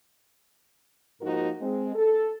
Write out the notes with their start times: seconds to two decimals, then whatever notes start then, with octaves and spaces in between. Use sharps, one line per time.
1.21 G#2 F3 A#3 D#4 F#4 A#4
1.61 G#3 C4
1.95 A4